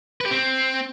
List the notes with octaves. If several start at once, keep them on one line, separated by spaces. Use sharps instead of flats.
B4
G4
C4